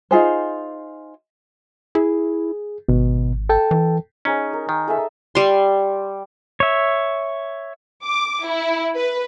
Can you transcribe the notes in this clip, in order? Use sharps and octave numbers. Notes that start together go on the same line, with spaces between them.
D#4 F4 G#4 C5
E4 G#4
G#1 B2
A4 G5 A5
E3
C#4 D#4 G#4 C#5
A#4
D#3
G#4 A4 E5
G3 C6
C#5 E5
D6
E4
B4